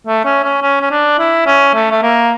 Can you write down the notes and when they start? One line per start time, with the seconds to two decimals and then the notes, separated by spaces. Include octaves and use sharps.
0.07 A3
0.25 C#4
0.44 C#4
0.62 C#4
0.81 C#4
0.91 D4
1.19 E4
1.46 C#4
1.74 A3
1.91 A3
2.02 A#3